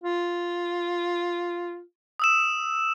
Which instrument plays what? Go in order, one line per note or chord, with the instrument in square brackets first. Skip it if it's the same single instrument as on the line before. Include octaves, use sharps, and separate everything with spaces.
[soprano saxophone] F4
[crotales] D#6 E6 E7